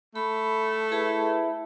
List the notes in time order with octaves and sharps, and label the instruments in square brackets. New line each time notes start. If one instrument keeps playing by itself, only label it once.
[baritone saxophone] A3 [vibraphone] B5
[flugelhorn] E4 [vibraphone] G#4 B4 A5